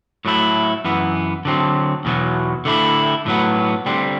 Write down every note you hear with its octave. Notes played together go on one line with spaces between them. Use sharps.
A2 F#3 A3 E4
F#2 E3 B3
D3 F#3 C4
E2 B2 F#3
D3 A3 E4
A2 F#3 B3
D3 G3 C4